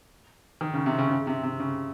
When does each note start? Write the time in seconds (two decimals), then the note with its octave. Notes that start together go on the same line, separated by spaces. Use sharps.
0.61 D#3
0.74 C#3
0.86 C3
0.98 C#3
1.11 C#3
1.27 C3
1.43 C3
1.60 C#3